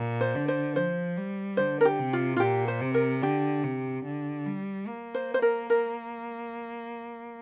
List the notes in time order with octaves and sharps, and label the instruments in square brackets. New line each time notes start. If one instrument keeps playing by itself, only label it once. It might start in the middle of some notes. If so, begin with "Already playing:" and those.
Already playing: [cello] A#2
[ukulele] C5
[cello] D3
[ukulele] C5
[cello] F3 [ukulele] C5
[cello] G3
[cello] D3 [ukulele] C5
[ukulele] A#4
G4
[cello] C3
[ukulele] F4
F4
[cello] A#2 [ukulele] G4
[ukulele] C5
[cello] C3
[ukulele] A#4
[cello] D3 [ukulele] G4
[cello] C3
D3
G3
A#3
[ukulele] C5
C5
A#4
A#4